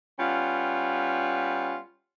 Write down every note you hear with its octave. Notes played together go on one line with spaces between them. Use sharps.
G3 B3 C#4 F4